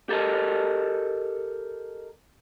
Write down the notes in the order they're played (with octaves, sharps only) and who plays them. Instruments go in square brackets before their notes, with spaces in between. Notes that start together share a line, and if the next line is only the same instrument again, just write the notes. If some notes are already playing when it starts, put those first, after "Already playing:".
[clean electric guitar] G4 A4 A#4 D#5 A5